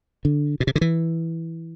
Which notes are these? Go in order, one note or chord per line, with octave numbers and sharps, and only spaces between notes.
D3
B2
C3
D3
E3